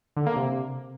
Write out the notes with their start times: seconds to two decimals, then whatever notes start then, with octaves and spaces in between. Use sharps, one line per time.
0.16 D3
0.26 A#3
0.36 C3